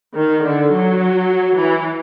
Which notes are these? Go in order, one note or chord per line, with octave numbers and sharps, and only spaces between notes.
D#3
D3
F#3
E3